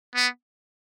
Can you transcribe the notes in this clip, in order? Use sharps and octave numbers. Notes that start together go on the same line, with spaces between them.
B3